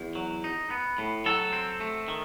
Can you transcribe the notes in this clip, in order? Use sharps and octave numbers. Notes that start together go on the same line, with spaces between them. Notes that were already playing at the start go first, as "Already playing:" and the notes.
Already playing: E2
F#3
D#4
B3
A2
F#3 A4
C4
A3
D#3